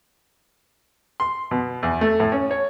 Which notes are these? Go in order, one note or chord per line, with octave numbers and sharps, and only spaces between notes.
C6
B2
E2
A3
A2
C#4
C#5